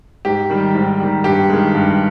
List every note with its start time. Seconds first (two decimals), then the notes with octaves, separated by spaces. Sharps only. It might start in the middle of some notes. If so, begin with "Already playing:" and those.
0.25 G#2 G4
0.50 D#3 G3
0.75 G#2
1.00 D#3 G3
1.24 G2 G4
1.49 D#3 G#3
1.75 G2